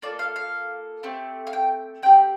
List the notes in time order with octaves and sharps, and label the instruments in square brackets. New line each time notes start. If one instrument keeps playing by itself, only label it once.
[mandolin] A#3 F4 A4 D5
F5
F5
A3 C4 G4
F5
G5
C4 G5
G4